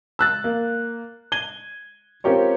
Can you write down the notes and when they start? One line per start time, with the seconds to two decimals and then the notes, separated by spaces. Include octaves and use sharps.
0.19 E6 F#6 A6
0.44 A#3
1.32 G#6 D#7 G7
2.24 C4 C#4 F4 G4 A#4 C#5